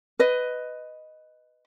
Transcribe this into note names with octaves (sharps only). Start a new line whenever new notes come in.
B4 D#5